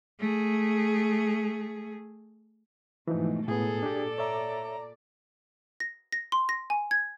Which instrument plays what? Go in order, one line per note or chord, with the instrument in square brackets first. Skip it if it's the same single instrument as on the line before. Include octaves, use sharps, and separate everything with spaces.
[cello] A3 G#4
[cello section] G#2 B2 A3 [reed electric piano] E3 F3 D#4
[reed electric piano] A2 B3 [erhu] G#4 [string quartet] A4
[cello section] A#2 D5 [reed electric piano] D4 G4
[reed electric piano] C#5 E5 [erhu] A#5
[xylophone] A#6
A#6
C6
A#6
G#5
G#6